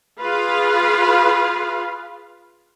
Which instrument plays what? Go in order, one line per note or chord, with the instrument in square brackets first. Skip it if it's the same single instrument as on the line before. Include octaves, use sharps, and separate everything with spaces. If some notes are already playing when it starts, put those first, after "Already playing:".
[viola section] F4 G#4 B4 F5